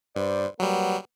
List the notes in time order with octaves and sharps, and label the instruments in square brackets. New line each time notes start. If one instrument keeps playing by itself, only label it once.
[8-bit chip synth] G2 [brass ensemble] B4 C5 D5
[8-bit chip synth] F#3 G3 [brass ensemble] A#3 B4 F#5